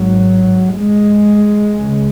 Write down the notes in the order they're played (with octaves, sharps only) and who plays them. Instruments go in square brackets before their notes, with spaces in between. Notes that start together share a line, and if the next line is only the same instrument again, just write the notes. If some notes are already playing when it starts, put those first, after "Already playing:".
Already playing: [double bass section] G#1 G#2 F#3
G#3
C#2 C#3